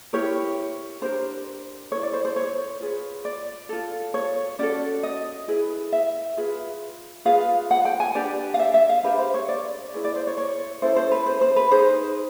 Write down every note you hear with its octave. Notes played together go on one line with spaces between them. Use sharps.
E4 G4 A#4 C#5
D4 G4 A#4 C5
E4 A4 C#5
D5
C5
C5
C#5
F4 G#4 B4
D5
F4 A4
C#5
C#4 F#4 A4 D5
D#5
E4 G#4 B4
E5
F4 G#4 B4
F4 G#4 B4 F5
F#5
G5
G#5
D4 G4 B4 D5
F5
E5
E5
F5
D4 G4 A#4 B4
C5
C#5
D5
E4 G#4 B4
D5
C5
C#5
C#5
C#4 E4 A4 C5
C5
B4
C5
C5
B4
D#4 G#4 B4 C5